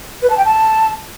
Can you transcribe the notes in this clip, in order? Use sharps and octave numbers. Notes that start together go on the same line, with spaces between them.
B4
A5
G5
A5